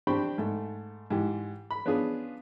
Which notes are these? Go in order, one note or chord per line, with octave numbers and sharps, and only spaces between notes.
C4 D4 G4 G5 B5 C#6
G#2 A3
G#2 E3 G4
B5
B3 C#4 D4 F4 G#4